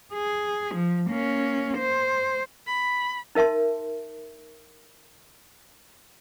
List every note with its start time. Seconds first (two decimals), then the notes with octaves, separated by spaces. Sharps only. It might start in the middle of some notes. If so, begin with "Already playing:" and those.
0.14 G#4
0.75 F3
1.10 A#3 C#4
1.78 C5
2.67 B5
3.35 D#4 A#4 E5 A5 C6